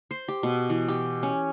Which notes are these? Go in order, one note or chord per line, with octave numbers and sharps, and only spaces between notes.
C5
G4
B2
E3
G4
C#4